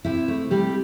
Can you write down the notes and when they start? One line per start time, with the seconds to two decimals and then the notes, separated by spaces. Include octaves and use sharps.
0.05 C3 E4
0.28 A3
0.50 C3 G3 G4